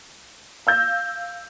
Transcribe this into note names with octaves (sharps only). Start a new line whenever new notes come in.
F5 E6 G6 A#6